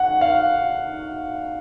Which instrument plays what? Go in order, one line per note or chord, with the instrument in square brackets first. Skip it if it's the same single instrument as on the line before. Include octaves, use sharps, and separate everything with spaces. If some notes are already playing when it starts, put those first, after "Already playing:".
Already playing: [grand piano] F#5
F5